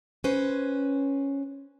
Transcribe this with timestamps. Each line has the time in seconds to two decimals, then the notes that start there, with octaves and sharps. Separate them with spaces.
0.24 C#4 B4 C5